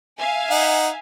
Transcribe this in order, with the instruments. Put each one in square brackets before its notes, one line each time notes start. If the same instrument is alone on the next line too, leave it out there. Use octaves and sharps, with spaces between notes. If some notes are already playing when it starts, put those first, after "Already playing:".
[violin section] E5 F5 G#5
[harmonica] D#4 F#5